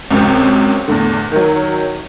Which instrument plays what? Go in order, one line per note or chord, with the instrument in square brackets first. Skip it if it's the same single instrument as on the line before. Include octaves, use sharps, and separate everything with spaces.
[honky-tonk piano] C#2 F#2 C3 C4
E2 A2 D3
D#3 F#3